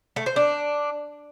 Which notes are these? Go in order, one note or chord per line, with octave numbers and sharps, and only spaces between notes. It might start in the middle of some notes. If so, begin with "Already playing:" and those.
A3
C5
D4